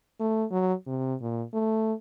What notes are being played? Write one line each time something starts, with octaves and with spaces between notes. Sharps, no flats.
A3
F#3
C3
A#2
A3